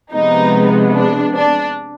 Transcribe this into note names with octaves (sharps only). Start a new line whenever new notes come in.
C3 F3 G#3 B3 D#4
D4
D4